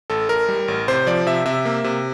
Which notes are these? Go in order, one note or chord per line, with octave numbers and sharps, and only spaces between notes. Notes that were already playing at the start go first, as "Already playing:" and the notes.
A1 A4
A1 A#4
G3
A1
C3 C5
F3 D5
C3 E5
C3 E5
A#3
C3